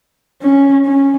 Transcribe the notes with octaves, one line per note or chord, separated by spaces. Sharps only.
C#4
C#4